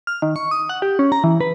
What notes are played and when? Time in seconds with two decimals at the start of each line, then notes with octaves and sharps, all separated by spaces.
0.07 F6
0.22 D#3
0.36 C#6
0.51 D#6
0.69 F#5
0.82 G4
0.99 C#4
1.12 A#5
1.24 E3
1.41 B4